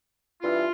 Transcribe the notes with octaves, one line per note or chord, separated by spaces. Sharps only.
G2 E3 F4